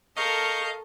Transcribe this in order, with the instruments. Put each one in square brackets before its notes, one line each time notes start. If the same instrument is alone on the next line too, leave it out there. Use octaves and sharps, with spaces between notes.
[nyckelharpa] A4 [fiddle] A#4 C#6 [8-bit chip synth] D#5 F5 G6